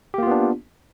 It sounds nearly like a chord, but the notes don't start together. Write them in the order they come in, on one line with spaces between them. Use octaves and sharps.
G4 A#3 F4 B3 D4